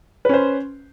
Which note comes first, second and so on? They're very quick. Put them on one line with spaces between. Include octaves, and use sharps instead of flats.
B4 C#4 C5